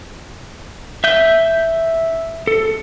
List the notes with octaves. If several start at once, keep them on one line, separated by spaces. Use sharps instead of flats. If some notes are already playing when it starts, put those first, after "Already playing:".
E5 G6
A4